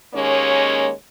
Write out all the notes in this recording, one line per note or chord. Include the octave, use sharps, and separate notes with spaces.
D#2 G#3 A#3 C#4 C#5